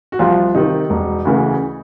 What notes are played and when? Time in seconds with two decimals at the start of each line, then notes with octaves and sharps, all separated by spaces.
0.12 F#4
0.19 C2 F3 F4
0.55 C3 D#3 D#4
0.90 E1
1.25 D2 C#3 E3